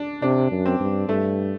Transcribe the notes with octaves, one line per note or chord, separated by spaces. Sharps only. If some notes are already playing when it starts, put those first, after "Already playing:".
Already playing: D4
C3 D4
F#2
C4
G2
G2 A3